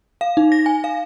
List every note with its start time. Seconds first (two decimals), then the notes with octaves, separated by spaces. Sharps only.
0.21 F5
0.37 D#4
0.52 A#6
0.66 G#5
0.84 F5